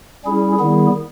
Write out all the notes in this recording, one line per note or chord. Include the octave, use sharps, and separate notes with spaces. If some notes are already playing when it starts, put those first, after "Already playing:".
G3 C#4 E4 G#4
D#3 G3 B3 E4 G#4